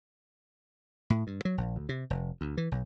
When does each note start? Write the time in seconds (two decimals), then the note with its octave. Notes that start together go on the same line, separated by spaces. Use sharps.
1.10 A2
1.27 G2
1.45 F#3
1.58 A#1
1.76 D2
1.89 C3
2.10 F1
2.41 D2
2.57 E3
2.72 B1